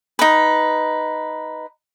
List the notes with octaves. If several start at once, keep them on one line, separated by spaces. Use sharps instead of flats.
D#4 B4